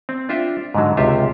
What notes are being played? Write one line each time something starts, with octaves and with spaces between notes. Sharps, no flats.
C4
D4 F4 E5 G5
G#2 D3 F#3
C#2 C3 F4 G4 E5